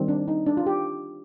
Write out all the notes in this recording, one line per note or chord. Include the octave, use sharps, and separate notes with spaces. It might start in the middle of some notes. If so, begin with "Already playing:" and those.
Already playing: D#3 G3 C4
D4
D#4
D4
F4
G4